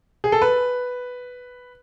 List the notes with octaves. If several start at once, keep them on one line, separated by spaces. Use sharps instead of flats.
G#4
A4
B4